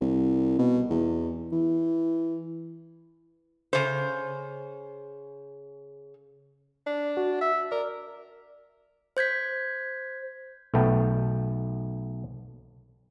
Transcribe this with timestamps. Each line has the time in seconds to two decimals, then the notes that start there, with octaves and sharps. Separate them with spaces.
0.01 C2
0.59 B2
0.91 E2
1.53 E3
3.73 C#3 C5
6.87 D4
7.17 F#4
7.41 E5
7.72 A#4 D5
9.17 C5 G6 G#6 B6
10.74 B1 A3 B3 G5 A5